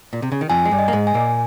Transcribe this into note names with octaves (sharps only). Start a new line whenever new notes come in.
A#2
C3
C#3
D#3
F2 F3 G#5
G#3
G2 G3
D#5
A#3
G#2 G#3
G#5
A#2 A#3